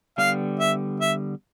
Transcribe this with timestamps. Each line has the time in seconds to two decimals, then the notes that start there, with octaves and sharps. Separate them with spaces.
0.18 D3 G3 B3 F5
0.59 E5
1.00 E5